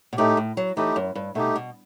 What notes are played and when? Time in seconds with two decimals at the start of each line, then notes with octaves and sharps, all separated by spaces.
0.13 B2
0.17 A2 A3 D#4 G4
0.37 A2
0.57 F#3
0.77 E3 A3 D#4 G4
0.96 F#2
1.15 G2
1.35 B2 A3 D#4 G4
1.56 B2